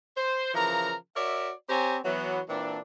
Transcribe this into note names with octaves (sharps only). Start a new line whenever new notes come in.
C5
C#3 E3 F3 A#4 A#5
F#4 A#4 C#5 D5 E5
C4 G4 C5 C#5 G#5 A#5
E3 F#3 B3
A#2 E3 C4 D4